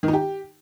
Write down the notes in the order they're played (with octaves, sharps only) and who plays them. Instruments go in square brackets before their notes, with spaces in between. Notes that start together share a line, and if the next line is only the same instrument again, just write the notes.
[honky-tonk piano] D#3
D#4
G4